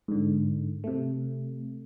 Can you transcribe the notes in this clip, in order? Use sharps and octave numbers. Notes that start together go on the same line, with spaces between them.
G#2 D3
C3 A3